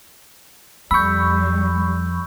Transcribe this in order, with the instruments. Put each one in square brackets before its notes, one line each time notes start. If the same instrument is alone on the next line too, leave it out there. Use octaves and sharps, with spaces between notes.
[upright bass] F2 [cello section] G3 [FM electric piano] B5 C#6 [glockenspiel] E6 G6